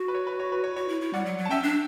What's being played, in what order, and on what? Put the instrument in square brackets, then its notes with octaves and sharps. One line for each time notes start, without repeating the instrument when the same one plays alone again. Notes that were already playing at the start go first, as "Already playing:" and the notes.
Already playing: [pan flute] F#4
[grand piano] B4
C#5
B4
C#5
B4
C#5
[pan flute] F#4 [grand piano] C#5
[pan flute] E4
E4
[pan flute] G3 [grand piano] D5 F#5
[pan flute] F#3
F#3
[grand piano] A5
[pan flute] C#4 [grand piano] E5 G5
[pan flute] D4